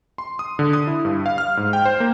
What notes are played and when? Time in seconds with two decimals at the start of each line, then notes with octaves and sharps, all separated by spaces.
0.18 C6
0.39 D#6
0.59 D3
0.73 D#6
0.87 E4
1.05 G2
1.26 F5
1.38 F6
1.57 G#2
1.73 G5
1.85 C5
2.00 A#3